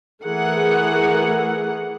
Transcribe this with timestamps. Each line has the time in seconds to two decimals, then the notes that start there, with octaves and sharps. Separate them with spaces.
0.23 E3 A3 G#4 A#4 F#5